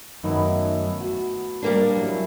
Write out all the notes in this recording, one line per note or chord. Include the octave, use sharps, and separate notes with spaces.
F#2 D#3 A3 B3 D#4 E4
F#4
G3 A#3 D4 A5
F#2 E3 F#3